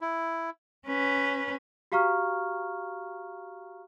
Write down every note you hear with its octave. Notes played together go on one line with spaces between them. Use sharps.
E4
C#4 B4
F#4 G4 F5 A#5 C#6 F6